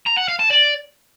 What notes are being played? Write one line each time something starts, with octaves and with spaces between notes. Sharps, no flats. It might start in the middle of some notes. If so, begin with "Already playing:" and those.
A#5
F#5
F5
A5
D5